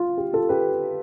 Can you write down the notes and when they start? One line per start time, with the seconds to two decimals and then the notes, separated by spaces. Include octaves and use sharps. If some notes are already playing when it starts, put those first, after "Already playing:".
Already playing: F4
0.18 G4
0.33 F4 A4
0.49 G4 B4